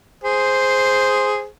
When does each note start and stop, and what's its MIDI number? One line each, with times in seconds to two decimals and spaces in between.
0.24 1.46 68
0.24 1.46 72